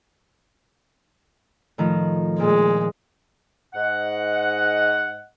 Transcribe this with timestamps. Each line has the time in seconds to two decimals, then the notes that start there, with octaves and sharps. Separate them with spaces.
1.78 A2 D#3 F3
2.40 A#2 G#3
3.74 G#2 D#5 F#5